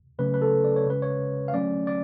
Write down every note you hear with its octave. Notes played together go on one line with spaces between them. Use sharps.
C#3 F#3 A3 C#4 B4
B4
A4
D5
C#5
C#3 G#3 C#4 B4
C#5
F5
D3 F#3 A3 C#4 D5
D5